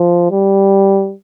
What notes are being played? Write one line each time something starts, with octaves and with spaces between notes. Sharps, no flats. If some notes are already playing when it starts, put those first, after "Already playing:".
Already playing: F3
G3